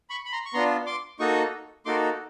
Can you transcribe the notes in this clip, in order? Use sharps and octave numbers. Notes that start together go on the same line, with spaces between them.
B5 C#6
B5
A#5 C6
C#6
B3 D4 F4 A#5 C6
C6 D6
A#3 D#4 F#4 A4 C#6 D#6
A#3 D#4 F#4 A4 C6 D6